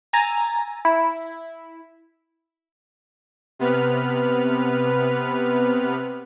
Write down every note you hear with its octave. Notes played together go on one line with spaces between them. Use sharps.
G#5 A#5 E6 A6
E4
C3 B3 B4 F6